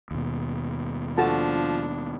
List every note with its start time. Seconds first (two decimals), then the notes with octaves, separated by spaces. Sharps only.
0.11 D#2 B2
1.18 F3 D4 F#4 A4 A5